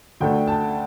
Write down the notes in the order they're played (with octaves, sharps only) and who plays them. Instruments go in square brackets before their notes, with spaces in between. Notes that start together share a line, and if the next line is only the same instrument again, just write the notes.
[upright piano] D2 D3 A3 G5
A5